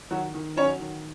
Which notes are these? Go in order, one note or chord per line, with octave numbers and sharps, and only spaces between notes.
D#3 F#3 F#4
D#3
F#3 C#4 C#5
D#3